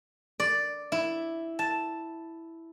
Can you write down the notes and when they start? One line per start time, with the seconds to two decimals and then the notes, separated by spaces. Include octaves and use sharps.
0.40 D5
0.92 E4
1.59 A5